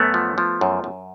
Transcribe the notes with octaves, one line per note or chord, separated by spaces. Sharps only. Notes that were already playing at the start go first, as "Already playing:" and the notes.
Already playing: F#2 A3 B3
F3
F3
F#2
F#2